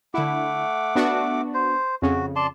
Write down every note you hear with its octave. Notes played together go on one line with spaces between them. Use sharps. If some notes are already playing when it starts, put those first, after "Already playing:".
D3 A3 E4 F#5 D6
B3 D4 F#4
C5
F2 C#3 F#4
D5 A5 C6